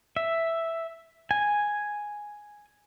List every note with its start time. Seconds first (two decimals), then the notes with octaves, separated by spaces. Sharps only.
0.16 E5
1.31 G#5